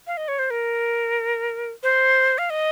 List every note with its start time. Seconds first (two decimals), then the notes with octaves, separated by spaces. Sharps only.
0.07 F5
0.17 D#5
0.28 C#5
0.39 C5
0.50 A#4
1.83 C5
2.38 F5
2.50 D#5